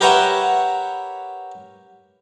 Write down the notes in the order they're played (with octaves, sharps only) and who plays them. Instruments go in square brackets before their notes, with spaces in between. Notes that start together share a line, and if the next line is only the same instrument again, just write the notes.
[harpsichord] G4 A#4 B4 C#5 E5 F#5